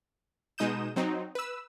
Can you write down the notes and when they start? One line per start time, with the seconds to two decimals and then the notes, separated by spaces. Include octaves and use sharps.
0.58 B2 G#3 D#4 D#6 G6 E7
0.96 F#3 C4 D#4
1.35 B4 E6